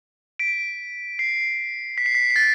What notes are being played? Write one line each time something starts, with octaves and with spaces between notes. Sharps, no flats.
B6 D7
C7
B6
C7
B6
B6
A6